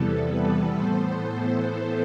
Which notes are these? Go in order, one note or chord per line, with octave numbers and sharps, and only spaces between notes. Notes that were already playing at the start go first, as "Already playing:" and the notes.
Already playing: E2 C3 E3 G3 B3 A4
B4
A2 E3 B3 A4 C5